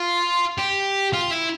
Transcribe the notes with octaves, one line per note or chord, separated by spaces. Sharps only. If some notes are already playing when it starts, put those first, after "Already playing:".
Already playing: F4
G4
F4
E4